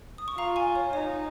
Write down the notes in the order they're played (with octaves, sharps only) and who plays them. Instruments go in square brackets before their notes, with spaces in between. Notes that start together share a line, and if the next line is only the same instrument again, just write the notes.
[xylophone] D#6
C#6
[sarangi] F4 [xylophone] F5 A#5
[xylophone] G#5 C#6
C#5
[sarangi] D#4 [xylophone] C#5